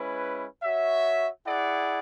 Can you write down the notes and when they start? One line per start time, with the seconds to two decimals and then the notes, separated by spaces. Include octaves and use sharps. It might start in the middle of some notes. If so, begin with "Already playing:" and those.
Already playing: G#3 C#4 E4 B4
0.63 F#4 C#5 E5
1.46 E4 G#4 D5 F#5